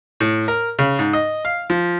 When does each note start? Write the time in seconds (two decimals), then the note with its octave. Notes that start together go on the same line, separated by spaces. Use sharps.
0.20 A2
0.48 A#4
0.79 C#3
0.99 G#2
1.13 D#5
1.45 F5
1.70 F3